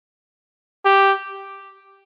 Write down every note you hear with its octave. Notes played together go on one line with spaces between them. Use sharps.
G4